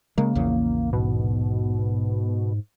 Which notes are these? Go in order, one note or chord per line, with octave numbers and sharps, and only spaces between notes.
C#3 G#3 A#3
A#1 E2 C#3
G#2 B2